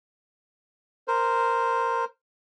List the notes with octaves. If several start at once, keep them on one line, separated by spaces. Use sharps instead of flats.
A#4 C5